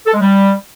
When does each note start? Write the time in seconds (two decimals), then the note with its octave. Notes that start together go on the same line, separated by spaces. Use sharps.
0.06 A4
0.14 G#3
0.21 G3